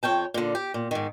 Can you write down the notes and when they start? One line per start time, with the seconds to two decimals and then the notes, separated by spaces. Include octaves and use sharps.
0.03 F2 C#5 G5 A5
0.34 A#2 D3
0.55 G4
0.74 A#2
0.91 G#2 D#3